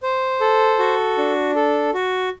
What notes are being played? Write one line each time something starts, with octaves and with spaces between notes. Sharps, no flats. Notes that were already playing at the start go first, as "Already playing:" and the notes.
C5
A4
F#4
D4
A4
F#4